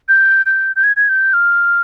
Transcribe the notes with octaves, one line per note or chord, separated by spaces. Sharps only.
G6
G6
G6
G#6
G#6
G6
F6